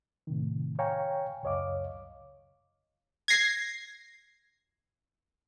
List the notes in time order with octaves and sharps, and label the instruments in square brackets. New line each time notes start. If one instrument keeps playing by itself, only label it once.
[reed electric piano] A2 C3 D#3
C#5 F5 G5 G#5 A#5 C#6
C#2 F#2 C#5 D#5 F5 D6
[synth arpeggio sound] G#6 A#6 C7